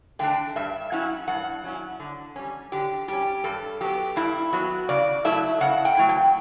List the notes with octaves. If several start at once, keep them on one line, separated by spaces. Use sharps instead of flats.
D3 A3 D4 G5
G2 E5
F#3 C#4 E4 F#5
G2 F#5
F#3 C#4 E4
D3
G3 C#4
D3 G4
G3 C#4 G4
G2 A4
F#3 B3 G4
G2 E4
F#3 B3 F#4
C#3 D5
F#3 A3 E4 E5
C#3 F#5
G5
F#3 A3 E4
G5